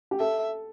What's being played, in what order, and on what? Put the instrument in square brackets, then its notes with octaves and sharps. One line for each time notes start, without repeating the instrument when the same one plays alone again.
[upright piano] G4
[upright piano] A4 [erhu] E5